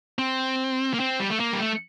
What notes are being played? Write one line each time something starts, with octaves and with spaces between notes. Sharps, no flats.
C4
A#3
C4
G3
A3
A#3
G3
A3